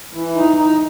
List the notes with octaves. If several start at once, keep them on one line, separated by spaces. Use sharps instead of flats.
E3
D#4
D#4